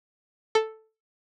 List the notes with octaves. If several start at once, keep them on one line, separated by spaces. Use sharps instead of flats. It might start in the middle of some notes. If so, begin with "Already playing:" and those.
A4